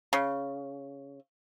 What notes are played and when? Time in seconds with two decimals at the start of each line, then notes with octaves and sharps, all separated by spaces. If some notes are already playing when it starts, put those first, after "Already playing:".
0.13 C#3